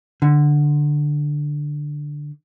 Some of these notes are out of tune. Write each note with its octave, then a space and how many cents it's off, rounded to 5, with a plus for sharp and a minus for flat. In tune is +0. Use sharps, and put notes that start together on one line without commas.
D3 +5